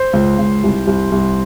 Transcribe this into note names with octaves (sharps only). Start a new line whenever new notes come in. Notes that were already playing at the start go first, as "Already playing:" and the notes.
Already playing: C5
C#2
C#2
C2
C2
C2